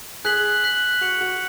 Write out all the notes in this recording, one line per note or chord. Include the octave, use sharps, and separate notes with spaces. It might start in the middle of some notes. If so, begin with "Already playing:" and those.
G#4 F#6 B6 F#7
F#6 B6 F#7
F#4 F#6 C#7 F7
F#4